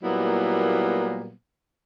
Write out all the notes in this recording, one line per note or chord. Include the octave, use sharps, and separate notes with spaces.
A#2 F#3 G3 A#3 B3 E4